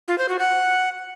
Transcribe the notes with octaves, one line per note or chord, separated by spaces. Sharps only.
F4
C5
F#4
F#5